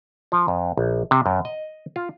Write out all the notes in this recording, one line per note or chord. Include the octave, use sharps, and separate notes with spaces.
F3
F2
A#1
C3
F#2
D#5
F4